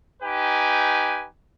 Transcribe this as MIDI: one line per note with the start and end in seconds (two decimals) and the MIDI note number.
0.23 1.26 63
0.23 1.26 67
0.23 1.26 71
0.23 1.26 80